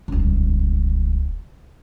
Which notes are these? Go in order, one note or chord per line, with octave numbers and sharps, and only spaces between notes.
D#1 C#2